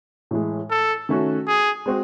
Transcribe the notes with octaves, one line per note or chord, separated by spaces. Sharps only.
A2 E3 G#3
A4
D#3 A3 C#4 F#4
G#4
G#3 C4 F#4